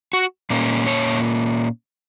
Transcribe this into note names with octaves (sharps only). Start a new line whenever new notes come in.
F#4
A#2 A#3 C#4
C#5